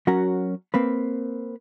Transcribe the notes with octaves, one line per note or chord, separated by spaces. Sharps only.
F#3 C#4 F#4 A#4
A#3 C4 B4